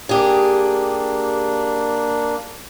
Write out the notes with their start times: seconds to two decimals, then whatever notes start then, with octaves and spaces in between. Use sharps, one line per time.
0.09 A#3 D4 G4 G#4